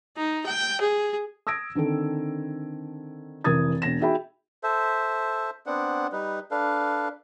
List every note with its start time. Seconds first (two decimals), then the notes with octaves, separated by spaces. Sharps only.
0.17 D#4
0.46 G5
0.81 G#4
1.47 D#6 E6 G#6 A#6 D7
1.75 D3 D#3 C4 A4
3.44 F1 E3 A#4 D#6 G#6 A6
3.82 E1 A#6 E7
4.00 D#4 F#4 G#4 E5 G5 B5
4.63 A4 C5 E5
5.66 B3 C4 D4 F#5
6.12 G3 D#4 B4
6.51 D4 A4 B4 F5